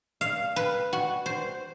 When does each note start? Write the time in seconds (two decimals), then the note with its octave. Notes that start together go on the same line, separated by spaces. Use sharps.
0.21 F5
0.56 B4
0.93 F#4
1.26 C5